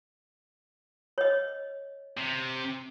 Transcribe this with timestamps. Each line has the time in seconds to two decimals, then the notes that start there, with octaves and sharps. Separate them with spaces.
1.18 C#5 D#5
2.17 C3